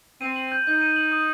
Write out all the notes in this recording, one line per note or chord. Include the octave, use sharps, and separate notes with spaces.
C4 D#7
F#7
G6
D#4 G6
D#7
F#7
D#6